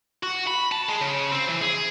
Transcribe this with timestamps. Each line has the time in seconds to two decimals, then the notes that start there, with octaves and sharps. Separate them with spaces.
0.23 F#4
0.47 B5
0.72 A5
0.89 G#3
1.01 C#3
1.31 C4
1.48 E3
1.62 G#4